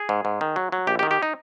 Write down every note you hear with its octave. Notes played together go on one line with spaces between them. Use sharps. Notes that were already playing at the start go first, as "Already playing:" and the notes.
Already playing: G#4
G#2
G#2
D#3
F#3
F#3
A#1 G4
G4
D#3
G4
D#4